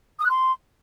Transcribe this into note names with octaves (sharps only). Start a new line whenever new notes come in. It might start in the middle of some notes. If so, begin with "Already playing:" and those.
D#6
F#6
C6